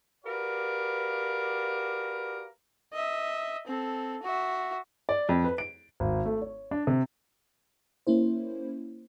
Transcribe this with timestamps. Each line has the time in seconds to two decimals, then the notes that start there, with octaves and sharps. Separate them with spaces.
0.25 F#4 G4 A#4 B4 D5 F5
2.93 D#5 E5
3.67 C4 A4
4.23 F#4 E5
5.09 D5
5.29 F2
5.44 B4
5.58 D7
6.00 G#1
6.26 A3
6.42 C#5
6.71 D4
6.87 C3
8.07 A#3 C#4 E4 C5